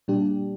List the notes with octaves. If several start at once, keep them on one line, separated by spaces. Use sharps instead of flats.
A#2 G3 D4 G4